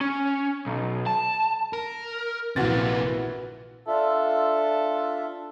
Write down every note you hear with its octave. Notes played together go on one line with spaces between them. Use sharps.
C#4
B1
A5
A#4
A#1 C3 E3 A#3 F#4 B4 A6
D4 F4 A4 E5